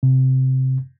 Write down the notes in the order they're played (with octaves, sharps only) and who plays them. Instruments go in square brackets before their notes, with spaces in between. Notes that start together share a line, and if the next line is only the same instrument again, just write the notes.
[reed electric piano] C3